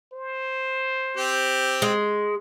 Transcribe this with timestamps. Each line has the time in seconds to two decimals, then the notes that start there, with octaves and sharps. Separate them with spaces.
0.13 C5
1.17 C4 G4
1.82 G#3